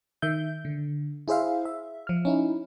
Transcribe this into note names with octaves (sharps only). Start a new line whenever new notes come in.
D#3 E5 G6
D3
E4 G#4 C5 E5 F5
E5
F3 F6
C#4 D#4 E4